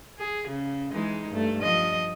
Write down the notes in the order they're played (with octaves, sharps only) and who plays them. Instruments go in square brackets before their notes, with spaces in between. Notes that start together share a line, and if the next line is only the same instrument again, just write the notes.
[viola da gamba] G#4
C#3
E3 G#3 D#4
G2 A3
F3 D#5